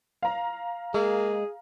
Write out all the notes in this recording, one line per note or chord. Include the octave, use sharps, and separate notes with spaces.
F5 A#5
G#3 A#3 G#4